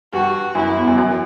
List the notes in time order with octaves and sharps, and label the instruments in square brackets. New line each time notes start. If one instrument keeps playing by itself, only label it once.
[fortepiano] G2 [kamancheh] F#4
[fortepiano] F#2 [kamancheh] E4
[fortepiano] E2
F#2
F#2